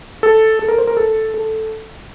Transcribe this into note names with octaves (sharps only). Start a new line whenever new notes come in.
A4
A4
A#4
C5
A#4
A4
A4